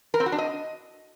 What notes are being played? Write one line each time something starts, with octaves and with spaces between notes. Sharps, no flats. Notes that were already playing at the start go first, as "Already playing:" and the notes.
A#4
C4
F#4
D4
D#5